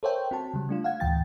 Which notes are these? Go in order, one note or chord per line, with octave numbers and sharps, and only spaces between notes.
A4 A#4 C5 C#5 E5 G5
C4 F#4 A5
C#3 G3
A3 D4 F4
F5 F#5 G#6
D2 A2 E3 G5 A6